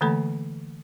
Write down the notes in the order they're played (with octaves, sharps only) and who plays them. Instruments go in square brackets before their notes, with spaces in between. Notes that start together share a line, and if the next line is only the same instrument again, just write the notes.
[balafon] D3 E3 A3 A#3 A4 B5